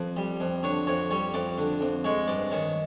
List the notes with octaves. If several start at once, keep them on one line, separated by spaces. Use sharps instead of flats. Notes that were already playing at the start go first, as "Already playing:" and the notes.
Already playing: F2
G3
F2
D3 C#5
F2 C#5
G3 C#5
F2 D5
D3
F2
G#3 C#5
G2 D5
D#3 C#5